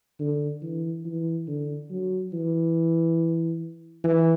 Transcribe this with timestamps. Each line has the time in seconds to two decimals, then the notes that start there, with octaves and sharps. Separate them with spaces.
0.20 D3
0.62 E3
1.05 E3
1.48 D3
1.90 F#3
2.33 E3
4.04 E3